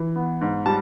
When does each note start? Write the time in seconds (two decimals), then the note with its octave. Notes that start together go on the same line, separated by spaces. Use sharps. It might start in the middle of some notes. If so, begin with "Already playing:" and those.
Already playing: E3
0.16 B3
0.41 G#2
0.66 G3 A5